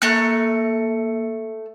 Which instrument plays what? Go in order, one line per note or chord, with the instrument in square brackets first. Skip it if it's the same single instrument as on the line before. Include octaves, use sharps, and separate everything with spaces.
[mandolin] A3 A#5 F#6 [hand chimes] A#3 C#7